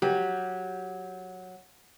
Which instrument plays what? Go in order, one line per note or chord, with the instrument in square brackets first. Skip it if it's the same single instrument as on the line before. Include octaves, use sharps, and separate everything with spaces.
[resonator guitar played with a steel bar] F#3 [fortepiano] G4